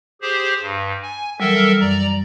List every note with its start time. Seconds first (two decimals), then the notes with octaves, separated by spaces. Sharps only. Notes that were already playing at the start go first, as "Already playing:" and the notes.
0.22 G4 G#4 C5
0.60 G2
1.03 G#5
1.40 E3 F#3 G3 A4 A#4 E5
1.80 F#2 D5 A#5